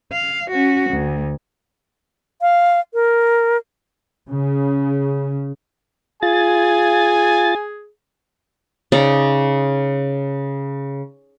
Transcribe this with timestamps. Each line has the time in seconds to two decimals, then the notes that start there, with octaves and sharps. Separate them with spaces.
0.12 F5
0.51 C#4 F#4
0.91 D2
2.42 F5
2.94 A#4
4.29 C#3
6.23 F4 G#4 G#5 A6
8.92 C#3 D#4 D5